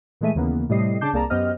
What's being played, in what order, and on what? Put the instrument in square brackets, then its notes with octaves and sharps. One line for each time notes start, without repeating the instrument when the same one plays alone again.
[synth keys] A#2 E3 G#3 A3 E5 D#7
D#2 C#3 E3 A#3 B3
A2 C3 G3 D#5 C7
C#3 D4 A5 D6 G6 C7
C2 A#3 G#4 D5 A5 A#5
F#2 B3 G4 C5 D#5 F6